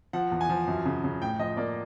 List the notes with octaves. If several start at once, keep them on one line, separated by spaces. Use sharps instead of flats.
F3 F#5
E2
G#5
F3
F#2
C#3
C#3
A2 G5
F3 D#5
A#3 D5